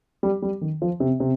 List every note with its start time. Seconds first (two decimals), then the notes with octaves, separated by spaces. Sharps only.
0.23 G3
0.42 G3
0.61 D#3
0.82 F3
1.00 C3
1.20 C3